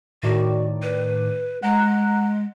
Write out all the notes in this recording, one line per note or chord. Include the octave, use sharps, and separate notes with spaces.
A2 D#3 F#4 D5
B4
G#3 F#5 A#5 F#6